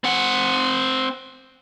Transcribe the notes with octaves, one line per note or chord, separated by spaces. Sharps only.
C4 F#5